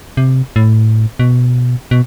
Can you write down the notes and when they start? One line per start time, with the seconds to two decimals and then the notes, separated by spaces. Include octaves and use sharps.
0.17 C3
0.56 A2
1.19 B2
1.91 B2